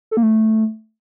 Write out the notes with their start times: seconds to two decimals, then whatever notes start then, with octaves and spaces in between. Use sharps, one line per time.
0.11 A4
0.17 A#3
0.23 A3